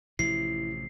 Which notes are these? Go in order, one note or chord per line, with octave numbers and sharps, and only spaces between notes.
A1 C3 F3 E4 C7